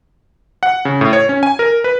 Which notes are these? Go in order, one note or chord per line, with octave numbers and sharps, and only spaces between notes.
F#5
C#3
A2
C#5
C#4
G#5
A#4
B4